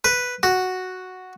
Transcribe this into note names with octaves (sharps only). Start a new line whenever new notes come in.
B4
F#4